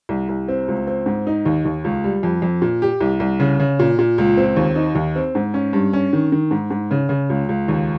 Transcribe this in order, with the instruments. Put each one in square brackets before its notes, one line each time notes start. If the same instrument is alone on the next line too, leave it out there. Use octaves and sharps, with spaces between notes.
[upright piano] C2
C2
C4
C#2
C4
G#2
D#4
D#2
D#2
C#2
G3
F2
F2
A#2
G4
C2
C2
C#3
C#3
A#2
A#2
C#2
C4
D#2
D#4
D#2
C4
G#2
C#4
G2
C#4
D#3
D#3
G#2
G#2
C#3
C#3
C#2
C#2
D#2